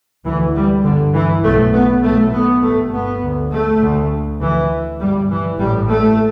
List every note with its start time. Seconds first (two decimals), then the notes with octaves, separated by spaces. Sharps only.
0.25 D2 E3
0.55 G3
0.84 G1 G2 D3
1.13 E3
1.43 B1 A2 A3
1.73 B3
2.03 B1 A2 A3
2.33 B3
2.62 G1 G2 A3
2.92 B3
3.22 D2
3.51 A3
3.81 D2
4.40 D2 E3
5.00 G1 G2 G3
5.29 E3
5.59 A1 A2 G3
5.88 A3